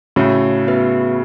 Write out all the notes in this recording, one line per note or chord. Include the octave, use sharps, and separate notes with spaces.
A2 C#3 F#4 C#5 E5
B3 F#4 B4 E5